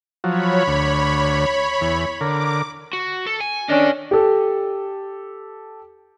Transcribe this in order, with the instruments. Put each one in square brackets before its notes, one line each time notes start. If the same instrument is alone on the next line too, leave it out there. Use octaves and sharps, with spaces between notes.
[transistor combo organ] F3 F#3 [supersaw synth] C#5 B5
[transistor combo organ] D2
E2
[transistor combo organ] D3 A#4 [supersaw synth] D6
[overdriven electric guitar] F#4
A4
G#5
[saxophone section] C#4 D4 [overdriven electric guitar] A#4 D#5
[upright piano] G4 A4